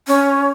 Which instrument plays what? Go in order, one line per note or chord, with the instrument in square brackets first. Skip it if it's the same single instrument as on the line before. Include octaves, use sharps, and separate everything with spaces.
[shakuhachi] C#4